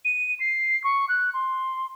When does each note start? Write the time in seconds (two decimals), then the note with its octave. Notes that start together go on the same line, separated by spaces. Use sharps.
0.05 D#7
0.40 C7
0.84 C#6
1.09 F#6
1.34 C6